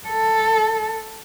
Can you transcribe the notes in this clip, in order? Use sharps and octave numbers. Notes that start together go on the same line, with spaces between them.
A4